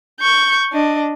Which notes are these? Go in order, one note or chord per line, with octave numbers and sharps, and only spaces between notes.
C#6 G6
D4 D#5